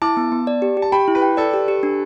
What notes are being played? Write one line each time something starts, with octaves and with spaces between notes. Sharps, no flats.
E4 A5 D6
B3
B3
D5
G4
G4
A5
G4 G5 B5
E4
B4
G5
A4 D5
G4
G4
D4